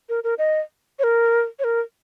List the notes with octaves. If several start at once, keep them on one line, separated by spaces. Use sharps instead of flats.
A#4
A#4
D#5
C#5
A#4
C#5
A#4